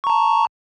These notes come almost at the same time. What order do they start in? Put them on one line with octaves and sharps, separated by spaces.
C#6 A#5 A5